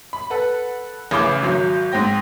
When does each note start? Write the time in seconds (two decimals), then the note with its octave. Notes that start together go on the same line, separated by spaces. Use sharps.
0.13 B5
0.30 A4 B4 F#5
1.11 A1 C#3 E3 B5 D6 G7
1.42 G#1 F#3
1.92 G#2 C4 G5 A#6